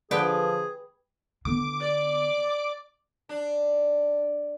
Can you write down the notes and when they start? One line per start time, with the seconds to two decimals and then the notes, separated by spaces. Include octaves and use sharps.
0.11 D3 F3 G4 G#4 B4 G5
1.45 D3 B3 D6
1.80 D5
3.29 D4